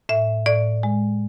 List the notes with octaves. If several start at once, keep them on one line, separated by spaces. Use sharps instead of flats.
A2 E5
A2 D5
G#3